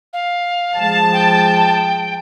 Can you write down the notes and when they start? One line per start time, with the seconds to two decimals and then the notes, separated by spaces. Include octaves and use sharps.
0.13 F5
0.76 F3 G#3 A5
1.13 G5